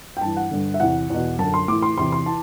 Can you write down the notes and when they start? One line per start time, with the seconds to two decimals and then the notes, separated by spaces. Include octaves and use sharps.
0.17 G5
0.21 G2 E3 A5
0.37 F#5
0.51 G2 D3
0.74 E5
0.80 E2 C3 E3 F#5
1.10 E2 B2
1.38 F#2 D3 A5
1.54 C6
1.68 A2 E3 D6
1.82 C6
1.98 E2 C3 E3 C6
2.12 C6
2.26 E3 A5